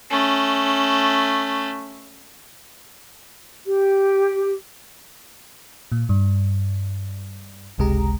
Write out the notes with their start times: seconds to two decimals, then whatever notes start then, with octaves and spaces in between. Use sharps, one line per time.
0.10 A3 C#4
3.66 G4
5.92 A#2
6.09 G2
7.78 G1 C#2 C3 G#3 G4 A#5